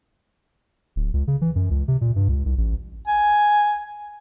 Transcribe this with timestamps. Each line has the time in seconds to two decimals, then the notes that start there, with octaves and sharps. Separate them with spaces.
0.96 D1
1.14 C#2
1.28 C#3
1.41 E3
1.55 F#2
1.70 C#2
1.88 C3
2.01 A#2
2.16 G2
2.29 C#2
2.46 C2
2.58 A1
3.07 G#5